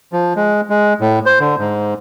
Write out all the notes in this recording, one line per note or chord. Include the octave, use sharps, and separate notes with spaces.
F3
G#3
G#3
A2
C5
D3
G#2